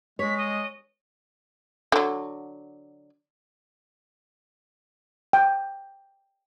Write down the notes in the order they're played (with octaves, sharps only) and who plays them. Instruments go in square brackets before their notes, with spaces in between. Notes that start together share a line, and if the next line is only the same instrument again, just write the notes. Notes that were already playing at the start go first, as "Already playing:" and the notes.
[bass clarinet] G#3 [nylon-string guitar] C#5 [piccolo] B6
[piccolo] D#5
[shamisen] D3 F#3
[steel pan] G5